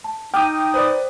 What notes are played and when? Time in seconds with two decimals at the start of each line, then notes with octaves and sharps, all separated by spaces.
0.04 A5
0.34 D#4 G5 D6 D#6 F6 G6
0.74 B4 C5 D5